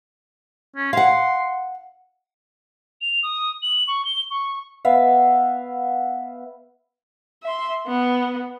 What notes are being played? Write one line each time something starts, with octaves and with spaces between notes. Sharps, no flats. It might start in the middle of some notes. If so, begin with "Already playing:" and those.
C#4
F5 F#5 C6
F7
D#6
F#7
C#6
G7
C#6
B3 E5 F5
E5 C6
B3